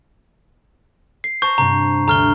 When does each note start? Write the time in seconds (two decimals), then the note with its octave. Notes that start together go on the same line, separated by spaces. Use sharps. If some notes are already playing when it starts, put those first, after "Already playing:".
1.24 C7
1.42 C5 A5 A#5 C#6 G6
1.58 G2 C3 A#5
2.08 D2 A#5 F6 G7